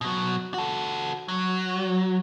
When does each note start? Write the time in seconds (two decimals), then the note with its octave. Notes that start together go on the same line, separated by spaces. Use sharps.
0.01 B2 F#3
0.54 F#4 A4
1.28 F#3